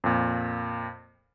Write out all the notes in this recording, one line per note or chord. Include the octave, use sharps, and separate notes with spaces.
F2 A#2